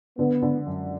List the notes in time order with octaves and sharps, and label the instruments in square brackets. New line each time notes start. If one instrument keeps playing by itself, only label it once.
[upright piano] D3 [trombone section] B3
[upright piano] D3
F#2